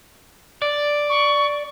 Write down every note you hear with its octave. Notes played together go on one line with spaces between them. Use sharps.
D5
C#6